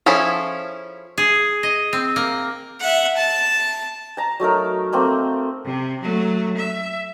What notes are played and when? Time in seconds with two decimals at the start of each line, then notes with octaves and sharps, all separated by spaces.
0.06 F3 C#4 E4 G#4 A4
1.18 G#4
1.63 D#5
1.93 C4
2.16 A#3
2.81 E5 F#5
3.17 A5
4.17 A5 A#5
4.40 F#3 A3 D#4 A#4
4.92 A3 A#3 C4
5.65 C3
6.01 F#3 A3
6.57 E5